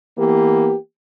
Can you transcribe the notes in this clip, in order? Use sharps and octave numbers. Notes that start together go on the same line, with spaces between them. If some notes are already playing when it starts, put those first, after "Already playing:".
E3 A#3 B3 G4